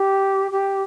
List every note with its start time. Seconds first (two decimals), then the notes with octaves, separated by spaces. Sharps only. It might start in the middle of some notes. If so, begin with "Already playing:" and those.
Already playing: G4
0.51 G4